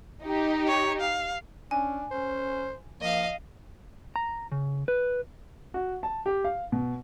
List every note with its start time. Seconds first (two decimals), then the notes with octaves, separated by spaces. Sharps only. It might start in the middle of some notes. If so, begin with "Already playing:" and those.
0.23 D#4 G4
0.68 C#5
1.00 F5
1.71 C#4 D4 G#5
2.11 C#4 C5
3.01 F3 A#3 D#5 F5
4.16 A#5
4.52 C#3
4.88 B4
5.74 F#4
6.03 A5
6.26 G4
6.44 F5
6.72 B2